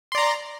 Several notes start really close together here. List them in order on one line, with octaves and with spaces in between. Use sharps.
C6 D5 A#5